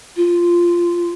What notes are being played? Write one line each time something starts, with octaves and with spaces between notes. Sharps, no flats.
F4